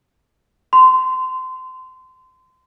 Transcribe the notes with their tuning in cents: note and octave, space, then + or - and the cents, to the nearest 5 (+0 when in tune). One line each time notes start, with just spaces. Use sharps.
C6 -25